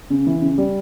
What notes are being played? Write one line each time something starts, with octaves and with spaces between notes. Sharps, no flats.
C#3
E3
C#3
G3